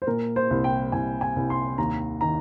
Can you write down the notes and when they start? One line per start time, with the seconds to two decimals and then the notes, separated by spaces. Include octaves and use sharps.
0.02 C5
0.07 A#2 A#4
0.36 C5
0.51 C2
0.64 G5
0.92 C2 G#5
1.21 G#5
1.36 C2
1.50 C6
1.78 D#2 A#5
2.21 D#3 A#5